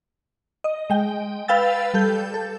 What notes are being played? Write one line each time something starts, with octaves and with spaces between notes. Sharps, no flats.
D#5
G#3 G5
B4 F5 G5 E6 A6
G3 A4 G6
A4